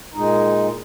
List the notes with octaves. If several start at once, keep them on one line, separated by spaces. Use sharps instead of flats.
A#2 G#3 D#4